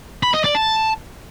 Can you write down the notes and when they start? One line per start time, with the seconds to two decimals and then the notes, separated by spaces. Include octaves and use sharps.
0.23 B5
0.34 D#5
0.44 D5
0.55 A5